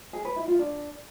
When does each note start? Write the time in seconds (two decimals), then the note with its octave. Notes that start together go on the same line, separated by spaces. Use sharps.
0.13 G#4
0.25 B4
0.36 E4
0.48 F4
0.59 D4